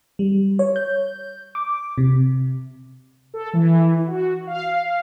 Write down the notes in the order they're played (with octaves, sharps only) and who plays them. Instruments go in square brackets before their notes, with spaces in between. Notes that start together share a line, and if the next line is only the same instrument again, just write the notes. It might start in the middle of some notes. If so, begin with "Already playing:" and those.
[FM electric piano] G3
C#5
G6
D6
C3
[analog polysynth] A4
E3
F#4
F5